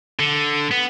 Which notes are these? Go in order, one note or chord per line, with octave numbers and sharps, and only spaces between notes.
D3
B3